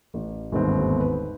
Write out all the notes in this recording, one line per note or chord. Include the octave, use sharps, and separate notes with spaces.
A1
G1 D#2 G#2 B3 C4
B4